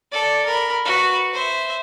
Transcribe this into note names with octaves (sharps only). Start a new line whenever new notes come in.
A4 D5
A#4 B5
F#4 B4
C5 E5